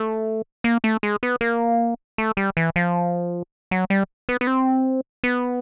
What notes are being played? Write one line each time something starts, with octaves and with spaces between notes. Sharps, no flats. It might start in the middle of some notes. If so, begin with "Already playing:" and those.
Already playing: A3
A#3
A3
G#3
B3
A#3
A3
G3
E3
F3
F#3
G3
B3
B3
C4
B3